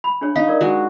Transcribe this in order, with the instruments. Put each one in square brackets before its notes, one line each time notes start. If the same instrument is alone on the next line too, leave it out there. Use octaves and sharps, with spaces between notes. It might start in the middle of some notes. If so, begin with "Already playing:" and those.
[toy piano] B5
D4 G#4 C#5
[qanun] D#4 [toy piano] F5
[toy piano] A#4 D5 D6
[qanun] G#3 F#4